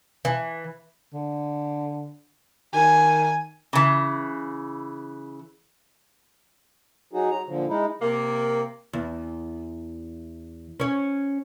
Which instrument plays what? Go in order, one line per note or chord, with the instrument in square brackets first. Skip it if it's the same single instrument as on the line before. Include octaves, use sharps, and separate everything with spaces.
[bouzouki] E3
[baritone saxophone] D3
[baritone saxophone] D#3 [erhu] G#5
[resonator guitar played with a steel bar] C#3 E3
[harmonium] F#3 D#4 F#4 G#4
F#3 A#5
A#2 D3 F3
G#3 D#4 E4
[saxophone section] C3 A#3
[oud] E2
C#4 C#5